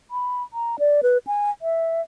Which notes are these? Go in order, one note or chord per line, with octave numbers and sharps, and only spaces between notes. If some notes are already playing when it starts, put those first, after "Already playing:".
B5
A#5
D5
B4
G#5
E5